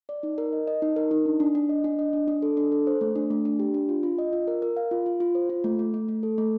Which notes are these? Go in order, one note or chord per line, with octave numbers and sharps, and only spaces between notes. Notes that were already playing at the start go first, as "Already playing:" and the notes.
D5
D#4
A#4
D#5
D#5
D#4
A#4
D#4
D4
D4
D4
D#5
D4
D#5
D4
D4
A4
D4
A4
C5
A3
D4
A3
D4
G4
D4
F4
F4
D#5
F4
A#4
A#4
F5
F4
F4
F4
C5
F4
A3
A3
A3
A3
A4
A3